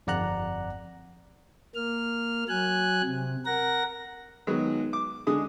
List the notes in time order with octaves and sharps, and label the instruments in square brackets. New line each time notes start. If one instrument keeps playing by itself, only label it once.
[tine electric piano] G1 F2 D5 F#5 A#5 F#6
[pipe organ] A#3 F6
F#3 G#5 F#6
C3
A#4 F#5 A#6
[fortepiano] D#3 F#3 G#3 B3 F#4 G#4
D6
D3 G#3 G#4 D#6